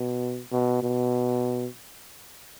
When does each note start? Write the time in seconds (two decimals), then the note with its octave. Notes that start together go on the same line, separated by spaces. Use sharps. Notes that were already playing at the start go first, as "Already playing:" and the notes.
Already playing: B2
0.52 B2
0.82 B2